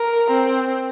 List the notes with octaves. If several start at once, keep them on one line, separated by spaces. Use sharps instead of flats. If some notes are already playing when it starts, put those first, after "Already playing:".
Already playing: A#4
C4